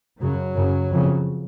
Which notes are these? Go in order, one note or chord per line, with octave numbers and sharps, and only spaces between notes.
F#2 C#3 F#3
F#2 C#3
F2 C#3